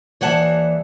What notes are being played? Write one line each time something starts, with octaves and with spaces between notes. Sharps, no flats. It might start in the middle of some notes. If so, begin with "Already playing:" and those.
D#2 E3 G3 F#5 A5